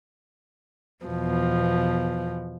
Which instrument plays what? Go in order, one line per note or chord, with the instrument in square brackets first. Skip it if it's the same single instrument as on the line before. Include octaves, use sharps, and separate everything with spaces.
[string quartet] E2 B2 F3